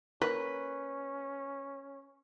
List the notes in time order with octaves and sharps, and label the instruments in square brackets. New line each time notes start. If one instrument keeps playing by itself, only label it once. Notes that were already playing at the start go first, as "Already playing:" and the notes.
[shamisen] A#3 [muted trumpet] C#4 [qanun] B4